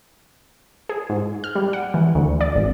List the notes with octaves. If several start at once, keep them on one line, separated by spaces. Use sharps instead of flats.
G#4
G#2
F6
G3
F#5
E3
D2
D5
G#1